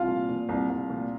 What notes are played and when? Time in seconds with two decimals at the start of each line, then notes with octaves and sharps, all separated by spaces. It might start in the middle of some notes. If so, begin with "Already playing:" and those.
Already playing: C2 F4 F5
0.08 A#2
0.29 A#2
0.49 C2
0.70 C2
0.90 A#2